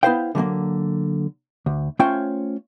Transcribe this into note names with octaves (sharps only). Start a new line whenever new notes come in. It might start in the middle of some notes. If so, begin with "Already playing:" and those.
B3 E4 B4 C5 F5 G5
D3 F#3 A3 A#3
D2
A3 C#4 F4 C5 C#5 G5